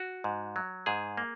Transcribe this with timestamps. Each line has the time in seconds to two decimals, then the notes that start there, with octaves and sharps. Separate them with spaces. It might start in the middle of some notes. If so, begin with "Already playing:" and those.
Already playing: F#4
0.24 G#2
0.56 F#3
0.86 G#2 G#4
1.17 A#3